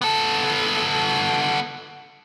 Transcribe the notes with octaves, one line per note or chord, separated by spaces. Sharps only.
B3 A4